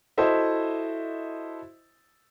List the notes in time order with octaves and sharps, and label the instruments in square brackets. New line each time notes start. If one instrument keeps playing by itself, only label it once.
[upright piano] E4 F#4 A4 C5 D#5 E5